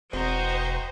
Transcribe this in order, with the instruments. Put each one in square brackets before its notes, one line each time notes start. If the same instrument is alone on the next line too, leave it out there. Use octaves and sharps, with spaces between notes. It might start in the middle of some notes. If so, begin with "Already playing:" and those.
[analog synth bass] E1 [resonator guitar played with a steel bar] C4 [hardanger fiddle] F#4 [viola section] C5 D#5 A#5